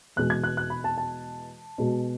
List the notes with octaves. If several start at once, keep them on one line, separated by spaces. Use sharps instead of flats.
E2 B2 G#3 F#6
G#6
F#6
F#6
B5
A5
A5
B2 G#3